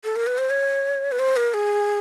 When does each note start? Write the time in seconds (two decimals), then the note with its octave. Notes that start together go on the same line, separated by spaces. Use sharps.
0.04 A4
0.16 A#4
0.27 B4
0.38 C5
0.50 C#5
1.12 B4
1.19 C5
1.37 A#4
1.54 G#4